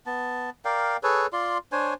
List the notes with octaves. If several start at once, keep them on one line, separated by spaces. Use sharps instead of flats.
B3 A5
A#4 D5 F5 G5
G#4 A4 B4 C#5
F4 D5 C6
D4 C5 C#5 G#5